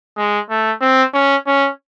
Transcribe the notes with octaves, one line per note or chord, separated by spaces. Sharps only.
G#3
A3
C4
C#4
C#4